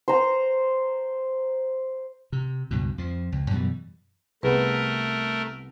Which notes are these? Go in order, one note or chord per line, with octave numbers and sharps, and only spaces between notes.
C5 A#5
C3
C#2 G2 B2
F2 F3
C#2
F#2 B2 E3 G3
C2 A3 B3 G#4 A#4 B4